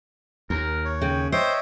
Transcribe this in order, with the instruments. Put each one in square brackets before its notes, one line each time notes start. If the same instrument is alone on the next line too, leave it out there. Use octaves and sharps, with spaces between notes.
[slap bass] D#2 [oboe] A#4
[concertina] C#5
[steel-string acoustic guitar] C#3 [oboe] G5
[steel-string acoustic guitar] C5 [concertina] C#5 D#5 E5 [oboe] G5